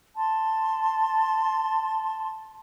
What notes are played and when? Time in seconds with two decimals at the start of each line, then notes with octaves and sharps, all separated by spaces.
0.16 A5 C6